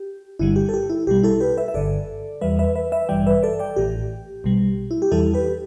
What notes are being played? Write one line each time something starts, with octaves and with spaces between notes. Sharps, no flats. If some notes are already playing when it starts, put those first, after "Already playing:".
Already playing: G4
G1 G2 D3 G3 E4
G4
A4
G4
E4
B1 B2 G3 G4
E4 A4
G4 B4
B4 E5
E5
G1 G2 D3 A4 D5
E2 E3 G3 B4 E5
B4 E5
B4 E5
B4 E5
A1 G2 E3 G3 D5 G5
B4 E5
A4 D5
D5 G5
A1 A2 E3 G4
B1 B2 G3
E4
G4
E2 E3 G3 E4 A4
G4 B4